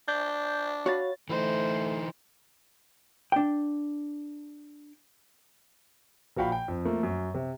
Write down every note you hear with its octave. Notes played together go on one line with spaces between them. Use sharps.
D4 G6
F#4 C#5 F5 B5 A6
E3 A3 D#4 C5
D4 G5
A#1 F3 F#4 F5 G5 B5
G5
F2
F3 A3 A#3
F#2
C3